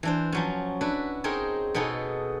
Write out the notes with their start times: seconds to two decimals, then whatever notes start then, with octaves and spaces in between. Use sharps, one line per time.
0.03 E3 D4 C5
0.32 F3 F#3 C#4
0.81 D4 E4 F#4 B4
1.24 C4 D#4 G#4 A#4 C#5
1.74 B2 B3 D#4 G#4 A4